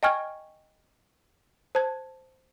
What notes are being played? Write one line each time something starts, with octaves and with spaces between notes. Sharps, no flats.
D#5 G5 G#5 C#6 F6 G#6
C5 A5 G#6